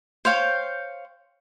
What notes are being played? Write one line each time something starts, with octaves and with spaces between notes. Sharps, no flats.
C5 C#5 F5 G5